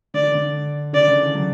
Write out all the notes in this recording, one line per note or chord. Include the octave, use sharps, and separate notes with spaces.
D3 D5
D3
C#3 D5
D3
E3
F#3